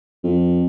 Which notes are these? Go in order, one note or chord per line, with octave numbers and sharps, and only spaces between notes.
F2